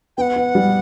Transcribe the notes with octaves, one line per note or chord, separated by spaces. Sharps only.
B3 F#5 G5
B3
G3